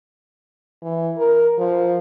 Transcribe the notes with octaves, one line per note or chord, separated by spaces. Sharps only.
E3
A#4
F3